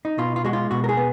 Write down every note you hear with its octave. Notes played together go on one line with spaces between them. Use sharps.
D#4
B2 F4
F4
G#3 F#4
F4
B2 F#4
A#4
G#4
B3